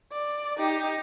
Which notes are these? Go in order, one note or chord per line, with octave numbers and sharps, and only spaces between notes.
D5
D#4 G4